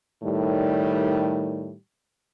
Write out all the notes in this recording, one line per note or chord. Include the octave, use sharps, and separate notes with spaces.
A2 D#3 G3